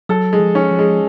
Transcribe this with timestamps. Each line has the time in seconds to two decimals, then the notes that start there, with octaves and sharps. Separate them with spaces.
0.09 F#3 A4
0.33 G#3
0.40 F3
0.55 C#4
0.71 F3
0.79 G#3